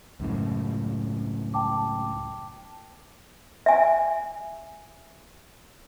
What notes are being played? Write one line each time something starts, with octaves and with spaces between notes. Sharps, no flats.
C#2 F#2 A2
G5 A5 D6
E5 G#5